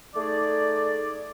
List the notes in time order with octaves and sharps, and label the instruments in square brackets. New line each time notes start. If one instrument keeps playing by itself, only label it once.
[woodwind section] A3 D#4 G#4 D5